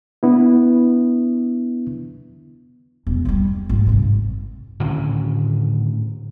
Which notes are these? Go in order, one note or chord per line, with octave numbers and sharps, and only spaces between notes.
B3 D4 E4
E1
F#3 G3
G#1
C2 G2
A2 D3 D#3 C#4